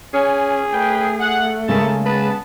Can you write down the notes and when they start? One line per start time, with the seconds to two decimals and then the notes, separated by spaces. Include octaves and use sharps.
0.14 C#4 G#4
0.73 A3 C#4 B4 G5
1.20 F#5
1.69 C#3 G#3 A#3 D#4 E4 A5
2.06 B3 B4 A5